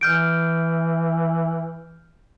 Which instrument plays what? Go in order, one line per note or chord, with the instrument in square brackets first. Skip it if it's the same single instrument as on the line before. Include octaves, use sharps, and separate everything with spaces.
[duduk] E3 [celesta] F6 G6 D7